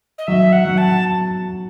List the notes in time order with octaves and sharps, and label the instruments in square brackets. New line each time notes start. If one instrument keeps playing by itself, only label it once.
[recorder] D#5
[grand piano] F#3 [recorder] E5
[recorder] F#5
[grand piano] F#3
[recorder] A5